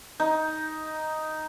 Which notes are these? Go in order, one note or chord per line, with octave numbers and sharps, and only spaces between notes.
D#4